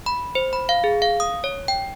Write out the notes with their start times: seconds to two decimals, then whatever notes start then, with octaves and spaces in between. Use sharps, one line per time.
0.06 B5
0.35 C5
0.53 B5
0.69 F5
0.84 G#4
1.02 F5
1.20 D#6
1.44 C#5
1.68 G5